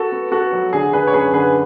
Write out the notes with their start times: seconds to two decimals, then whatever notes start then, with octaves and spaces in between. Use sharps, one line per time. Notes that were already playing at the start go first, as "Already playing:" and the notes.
Already playing: F#4 A4
0.12 B3
0.32 B3 F#4 A4
0.52 F#3
0.73 D3 G#4
0.93 D3 G#4 B4
1.07 C#5
1.14 F#2 G#4 B4
1.34 D3 G#4 B4